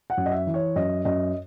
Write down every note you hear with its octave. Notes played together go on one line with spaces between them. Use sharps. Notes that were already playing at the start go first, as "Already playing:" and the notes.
F#5
F#2
D#5
E5
E3
C#5
F#2 D#5
F#2 D#5